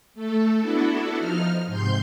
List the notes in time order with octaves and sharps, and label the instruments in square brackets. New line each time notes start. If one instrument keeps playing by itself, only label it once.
[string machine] A3 A4
B3 D4 E4 F#4 A4
F3 D#4 F6
G#2 C3 C6 G6